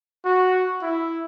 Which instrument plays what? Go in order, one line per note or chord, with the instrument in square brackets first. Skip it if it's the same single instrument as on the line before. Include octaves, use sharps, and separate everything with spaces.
[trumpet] F#4
E4